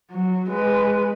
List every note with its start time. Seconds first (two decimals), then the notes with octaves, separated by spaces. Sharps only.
0.11 F#3
0.49 G#3 B4